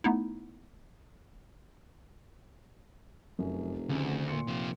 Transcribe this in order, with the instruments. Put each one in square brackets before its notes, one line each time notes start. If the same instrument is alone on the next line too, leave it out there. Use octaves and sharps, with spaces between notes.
[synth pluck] A3 B3 D#4 E4
[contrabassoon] F1 [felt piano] F#2
[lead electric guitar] D2 [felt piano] C#3
[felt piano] A#2 C6 C#7
[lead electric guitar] C3 F3